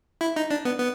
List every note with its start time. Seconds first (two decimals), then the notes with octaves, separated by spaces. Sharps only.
0.21 E4
0.36 D#4
0.51 D4
0.65 B3
0.79 B3